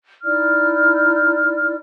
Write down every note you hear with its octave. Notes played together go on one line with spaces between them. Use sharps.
D#4 E4 D5 F6